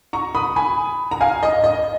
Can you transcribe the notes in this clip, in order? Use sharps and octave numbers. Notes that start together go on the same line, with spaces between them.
A#5 C#6
B5 D#6
G#5 B5
A#5
F5 G#5
D#5
D#5